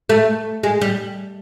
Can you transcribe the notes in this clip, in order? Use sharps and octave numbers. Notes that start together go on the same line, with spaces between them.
A3
G#3
G3